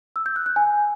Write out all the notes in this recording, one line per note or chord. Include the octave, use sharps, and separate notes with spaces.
E6
G6
F#6
F#6
G#5